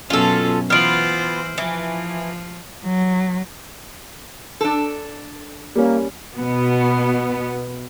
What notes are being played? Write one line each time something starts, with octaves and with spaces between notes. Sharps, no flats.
F#2 B2 C#4 F4 A4
E3 B3 F4 C5 F6 D7 F#7
E3 F3
F#3
D4 A4
G3 A#3 C#4
B2 B3